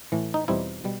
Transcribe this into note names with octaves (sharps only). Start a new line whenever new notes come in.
A2 E3 A3
D#4
E2 B2 G3 C4 D#4 E4
B2 G3